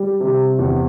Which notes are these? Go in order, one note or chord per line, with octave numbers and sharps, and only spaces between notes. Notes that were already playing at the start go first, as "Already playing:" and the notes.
Already playing: G3
C3
E2